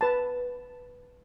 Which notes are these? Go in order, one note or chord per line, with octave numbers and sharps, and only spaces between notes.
B4 A5